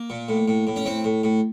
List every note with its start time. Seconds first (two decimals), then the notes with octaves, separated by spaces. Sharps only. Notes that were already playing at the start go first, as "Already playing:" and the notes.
Already playing: A#3
0.10 A#2
0.29 A2
0.48 A2
0.67 A2
0.76 C#4
0.85 A2 C4
1.04 A2
1.23 A2